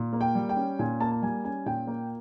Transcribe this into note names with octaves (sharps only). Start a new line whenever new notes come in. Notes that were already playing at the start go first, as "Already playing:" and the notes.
Already playing: A#2
A#3
G5
G3
G5
C#4
A#2 G#5
A#3 A5
A5
G3 G#5
C#4 G#5
A#2 G5
A#3